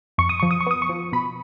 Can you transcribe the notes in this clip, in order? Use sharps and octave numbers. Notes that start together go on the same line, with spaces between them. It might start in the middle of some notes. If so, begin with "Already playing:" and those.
F2 C#6
D#6
F3 C#6
D#6
C#6
B3 D#6
C#6
F3
B2 B5